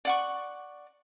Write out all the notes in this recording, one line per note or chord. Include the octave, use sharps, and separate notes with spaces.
D5 F#5 C#6